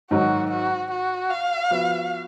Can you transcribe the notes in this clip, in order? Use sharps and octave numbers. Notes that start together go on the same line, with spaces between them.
G#2 D#3 F#3 F#4
F#4
F#4
F5
F3 B3 F#4